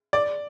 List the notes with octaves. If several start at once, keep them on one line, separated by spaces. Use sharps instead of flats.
D5